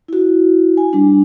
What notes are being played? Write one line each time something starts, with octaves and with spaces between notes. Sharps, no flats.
E4 F#4
G#5
G3 D4